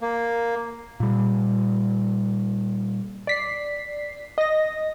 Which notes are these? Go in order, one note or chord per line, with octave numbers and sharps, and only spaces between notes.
A#3
A#2 G3
D5 B6 C7
D#5 A#6